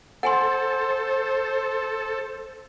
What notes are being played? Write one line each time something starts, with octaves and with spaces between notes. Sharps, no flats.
A4 C5 F#5 G#5 C6